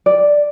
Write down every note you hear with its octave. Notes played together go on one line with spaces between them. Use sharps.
D5